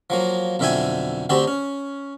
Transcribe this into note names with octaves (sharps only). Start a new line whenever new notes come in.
F3 F#3 A#3
B1 F2 D3 E5 G5 G#5
D2 D3 C4 F#4 G4 A5
C#4